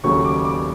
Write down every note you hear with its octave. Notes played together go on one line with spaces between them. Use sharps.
D#2 C#3 F#3 A3 C#6
D6
D6